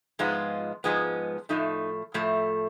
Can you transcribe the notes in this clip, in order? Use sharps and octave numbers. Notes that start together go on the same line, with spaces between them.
G#2 F3 G#3 B3 F4
G#2 F3 G#3 B3
A2 F3 A3 D#4
A2 F3 A3